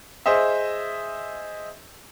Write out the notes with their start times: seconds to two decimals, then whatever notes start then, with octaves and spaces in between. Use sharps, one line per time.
0.26 G#4 C5 D#5 E5